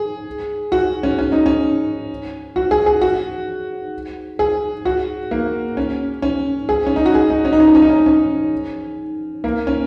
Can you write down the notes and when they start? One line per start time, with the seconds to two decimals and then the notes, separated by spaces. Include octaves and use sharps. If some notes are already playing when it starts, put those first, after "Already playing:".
Already playing: G#4
0.72 F#4
1.03 C#4
1.19 C#4
1.32 D#4
1.46 C#4
2.56 F#4
2.71 G#4
2.86 G#4
3.01 F#4
4.39 G#4
4.85 F#4
5.31 A#3
5.77 C#4
6.22 C#4
6.69 G#4
6.87 C#4
6.96 D#4
7.06 F#4
7.14 G#4
7.30 D#4
7.45 C#4
7.53 D#4
7.60 C#4
7.67 D#4
7.75 C#4
7.82 D#4
7.89 C#4
8.06 C#4
9.44 A#3
9.67 C#4